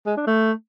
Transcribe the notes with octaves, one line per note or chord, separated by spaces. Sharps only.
G#3
D4
A3